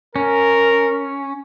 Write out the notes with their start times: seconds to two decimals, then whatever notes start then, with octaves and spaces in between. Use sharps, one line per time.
0.16 C#4 A#4